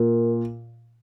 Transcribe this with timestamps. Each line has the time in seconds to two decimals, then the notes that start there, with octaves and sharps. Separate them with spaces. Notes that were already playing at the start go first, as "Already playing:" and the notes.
Already playing: A#2 A#4